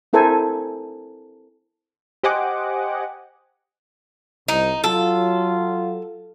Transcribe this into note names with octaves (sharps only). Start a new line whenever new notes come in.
C4 E4 A4 A#4 C5 G#5
G4 C5 D#5 F#5 G#5 D6
C2 D#4
F#3 F4 A4